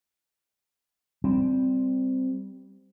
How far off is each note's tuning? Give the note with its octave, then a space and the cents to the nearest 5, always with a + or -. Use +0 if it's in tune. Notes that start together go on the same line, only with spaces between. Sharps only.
G3 +0 C4 -10